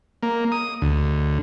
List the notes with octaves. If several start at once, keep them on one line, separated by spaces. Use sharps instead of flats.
A#3
D#6
D2